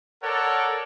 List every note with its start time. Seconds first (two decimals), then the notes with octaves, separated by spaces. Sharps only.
0.23 A4 A#4 C#5 D5 F#5